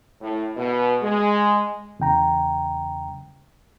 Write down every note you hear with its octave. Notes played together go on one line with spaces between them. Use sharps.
A2
B2
G#3
E2 C#3 G5 A#5